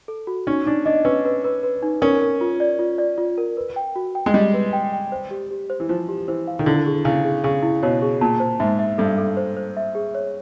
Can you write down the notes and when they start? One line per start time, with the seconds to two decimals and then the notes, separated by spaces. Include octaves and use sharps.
0.08 A4
0.27 F#4
0.47 C#4 D#4
0.66 D4 D#4
0.85 D4 D#5
1.05 C#4 B4
1.25 B4
1.44 B4
1.63 B4
1.82 D#4
2.02 C#4 A#4
2.21 A#4
2.41 F4
2.60 D5
2.79 F4
2.98 D5
3.18 F4
3.38 A#4
3.57 B4
3.76 G5
3.96 F#4
4.15 G5
4.26 G#3
4.34 G3 D#5
4.54 B4
4.73 G5
4.93 G5
5.12 C5
5.31 G4
5.51 G4
5.70 C5
5.80 E3
5.89 F3 C5
6.09 G4
6.28 E3 C5
6.47 F5
6.59 D#3
6.66 D3 E4
6.86 G#4
7.04 C#3 E4
7.25 G#4
7.44 C#3 G#4
7.63 E4
7.83 B2 C#5
8.02 G#4
8.21 A#2 A5
8.40 C5
8.60 G#2 E5
8.79 E5
8.98 G2 A4
9.18 A4
9.37 C5
9.57 C5
9.77 E5
9.95 G#4
10.15 C#5